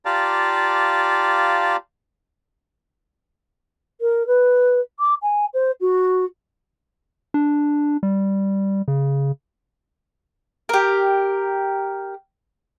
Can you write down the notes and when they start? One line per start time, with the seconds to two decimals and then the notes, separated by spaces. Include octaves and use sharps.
0.05 F4 G4 D5 F5 A5 A#5
4.01 A#4
4.27 B4
4.99 D6
5.22 G#5
5.54 C5
5.81 F#4
7.34 D4
8.03 G3
8.88 C#3
10.69 G4 A#4